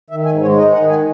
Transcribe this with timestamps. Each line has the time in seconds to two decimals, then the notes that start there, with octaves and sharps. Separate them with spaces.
0.10 D#3 E5
0.26 G#2 G#5
0.41 G#3 C#5
0.58 D#4 D#5
0.73 D#3 F#5
0.90 G#5